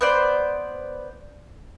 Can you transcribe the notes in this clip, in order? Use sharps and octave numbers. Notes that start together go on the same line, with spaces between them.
B3 C5 D5